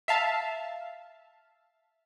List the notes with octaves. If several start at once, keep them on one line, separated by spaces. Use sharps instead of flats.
E5 F5 A5